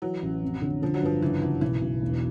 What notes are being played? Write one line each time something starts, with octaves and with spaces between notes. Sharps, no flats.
E3 F#3
A1
F2
D3
D3 F3
F#3
G2 F3
F#1 E3
F#1 E3
B1 E3
B1
E1